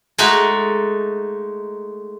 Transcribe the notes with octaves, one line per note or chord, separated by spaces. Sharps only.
G#3 A3 D#4 F#4 A4